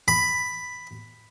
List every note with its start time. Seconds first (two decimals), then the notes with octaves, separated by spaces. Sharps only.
0.08 B5